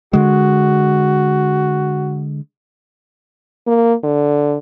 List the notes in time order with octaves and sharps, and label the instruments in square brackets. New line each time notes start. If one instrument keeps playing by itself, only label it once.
[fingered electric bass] D3 G#3 [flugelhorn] F#4
[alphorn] A#3
D3